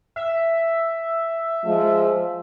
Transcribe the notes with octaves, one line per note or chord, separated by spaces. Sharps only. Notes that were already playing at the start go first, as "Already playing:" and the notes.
E5
F3 G#3